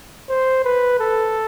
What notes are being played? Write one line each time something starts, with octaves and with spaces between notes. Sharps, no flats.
C5
B4
A4